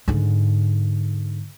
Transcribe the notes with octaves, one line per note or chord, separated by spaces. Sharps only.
G#2 D3